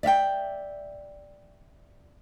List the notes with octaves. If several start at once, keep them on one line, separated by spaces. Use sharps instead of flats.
D5 E5 F5 G5